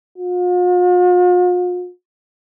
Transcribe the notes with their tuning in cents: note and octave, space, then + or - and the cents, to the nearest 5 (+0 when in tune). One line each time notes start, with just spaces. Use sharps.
F4 +45